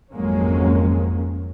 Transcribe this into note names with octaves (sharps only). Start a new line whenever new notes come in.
G#1 F2 F#3 G#3 A#3 C#4